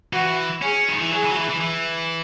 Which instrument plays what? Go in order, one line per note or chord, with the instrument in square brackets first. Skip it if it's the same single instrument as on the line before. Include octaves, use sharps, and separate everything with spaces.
[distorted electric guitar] E3 [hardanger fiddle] F#4
[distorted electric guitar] C#4 [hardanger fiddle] G#4
[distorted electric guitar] D#3
E3
[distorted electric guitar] F#3 [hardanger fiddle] G#4
[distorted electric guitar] E3
F#3
E3
E3
E3